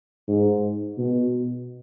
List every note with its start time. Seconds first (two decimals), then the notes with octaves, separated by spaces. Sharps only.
0.28 G#2
0.98 B2